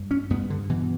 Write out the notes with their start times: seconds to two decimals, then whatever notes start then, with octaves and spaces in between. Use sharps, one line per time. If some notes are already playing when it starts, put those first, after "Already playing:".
Already playing: G2
0.11 C#4
0.30 G2 B3
0.50 D3
0.70 B2 E3